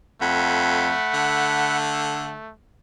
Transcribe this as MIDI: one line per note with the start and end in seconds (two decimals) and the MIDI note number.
0.21 0.94 41
0.21 2.52 57
0.21 1.77 78
0.21 1.77 83
1.14 2.36 50